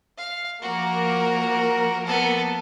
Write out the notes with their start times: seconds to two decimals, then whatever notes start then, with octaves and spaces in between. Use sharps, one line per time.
0.17 F5
0.62 F3 A#3 F#4 A#4
2.06 B3 A4